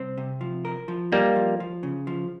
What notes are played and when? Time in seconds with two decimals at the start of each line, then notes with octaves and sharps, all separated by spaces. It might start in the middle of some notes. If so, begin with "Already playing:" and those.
Already playing: C2 C4
0.18 C3
0.41 F3
0.65 A#4
0.88 F3
1.12 G3 A#3 D#4
1.36 F3
1.60 F3
1.83 C#3
2.07 F3